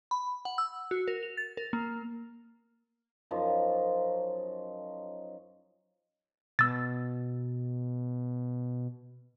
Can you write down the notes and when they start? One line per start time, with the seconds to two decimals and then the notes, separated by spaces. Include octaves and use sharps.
0.11 B5
0.45 F#5
0.58 E6
0.91 F#4
1.08 A#4
1.23 F7
1.37 A6
1.57 A#4
1.73 A#3
3.31 F#2 F3 D#4 F4
6.59 B2 E6 A6